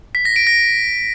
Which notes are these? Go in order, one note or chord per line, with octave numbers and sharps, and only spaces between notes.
B6
A#6
D7
A#6